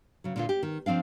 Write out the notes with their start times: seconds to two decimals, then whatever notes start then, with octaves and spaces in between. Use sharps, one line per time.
0.24 C#3 F#3
0.36 A#2 D3 F4
0.49 G4
0.63 D#3
0.86 F3 G#3 C4 D4 F5